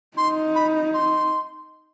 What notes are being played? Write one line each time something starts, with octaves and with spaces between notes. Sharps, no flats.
D#4 C6
B5
C6